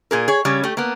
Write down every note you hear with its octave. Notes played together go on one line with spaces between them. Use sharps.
A#2 G#4 A#4
G#4 C#5
C#3 G3 C#4
A3 G4
A#3 B3